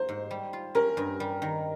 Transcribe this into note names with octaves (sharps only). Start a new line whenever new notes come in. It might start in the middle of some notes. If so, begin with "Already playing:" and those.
Already playing: A#3 C5
G#2
G3
F4
C#4 A#4
G2
G3
D#3